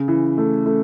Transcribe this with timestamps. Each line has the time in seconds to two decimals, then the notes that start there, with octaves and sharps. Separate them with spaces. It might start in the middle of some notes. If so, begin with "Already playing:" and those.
Already playing: C#3
0.08 E3
0.38 A3
0.66 A3